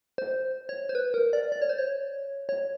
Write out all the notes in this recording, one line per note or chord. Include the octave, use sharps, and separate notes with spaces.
C5
C#5
C5
B4
A#4
D5
D5
C#5
C5
C#5
C#5